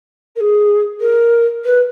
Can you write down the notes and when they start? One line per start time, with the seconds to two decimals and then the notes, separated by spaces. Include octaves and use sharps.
0.36 A#4
0.40 G#4
1.00 A#4
1.65 B4